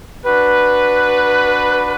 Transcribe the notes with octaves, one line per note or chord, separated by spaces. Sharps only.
D4 F#4 B4